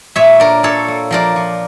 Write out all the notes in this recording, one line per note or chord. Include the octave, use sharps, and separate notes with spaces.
A#2 C#5 E5
D4 A#4 D5
A#2 A4 C#5
A#3
F3 A#4 D5
F3